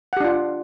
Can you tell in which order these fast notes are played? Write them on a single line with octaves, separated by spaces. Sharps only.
F#5 G4 D4 F4